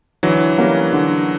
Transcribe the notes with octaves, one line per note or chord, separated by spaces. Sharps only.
D3 E3 F#3
G3 A#3 C#4
D3